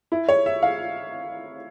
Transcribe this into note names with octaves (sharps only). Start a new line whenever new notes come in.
E4
C#5
E5
F5